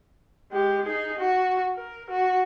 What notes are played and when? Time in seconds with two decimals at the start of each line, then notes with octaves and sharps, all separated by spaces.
0.52 G#3 G4
0.86 D#4 G#4
1.19 F#4
1.76 A#4
2.10 F#4